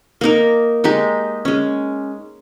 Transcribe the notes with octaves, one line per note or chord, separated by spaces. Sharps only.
A#3 D#4 A#4
G#3 D#4 G4
G#3 C#4